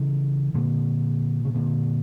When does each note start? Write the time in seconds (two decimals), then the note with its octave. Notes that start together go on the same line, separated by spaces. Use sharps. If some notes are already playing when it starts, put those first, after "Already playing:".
Already playing: C#3 E3
0.54 A#2 D3
1.45 C#3
1.55 A#2 D3